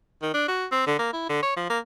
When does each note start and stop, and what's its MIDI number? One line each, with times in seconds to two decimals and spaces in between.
0.22 0.30 51
0.34 0.47 62
0.48 0.65 66
0.72 0.85 60
0.87 0.94 50
0.99 1.12 58
1.13 1.25 64
1.29 1.39 50
1.43 1.53 73
1.56 1.66 53
1.70 1.79 58